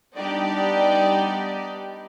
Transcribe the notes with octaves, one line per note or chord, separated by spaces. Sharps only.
G3 B3 D4 D#4 G4 D5